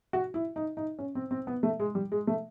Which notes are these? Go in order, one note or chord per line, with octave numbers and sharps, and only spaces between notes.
F#4
E4
D#4
D#4
C#4
C4
C4
B3
A3
G#3
G3
G#3
A3